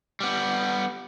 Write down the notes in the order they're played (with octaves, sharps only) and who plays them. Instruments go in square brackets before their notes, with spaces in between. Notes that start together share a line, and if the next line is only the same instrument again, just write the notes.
[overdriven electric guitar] G3 B3